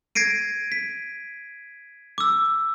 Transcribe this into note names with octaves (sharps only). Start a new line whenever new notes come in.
G#6 A#6 C7 D7 D#7
B6
D6 E6